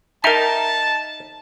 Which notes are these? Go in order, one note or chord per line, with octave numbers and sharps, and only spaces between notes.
D#4 A#4 E5 G5 A5 A#5